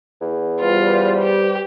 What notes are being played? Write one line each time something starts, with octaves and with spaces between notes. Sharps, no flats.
E2
G3 F4 B4 C5
G4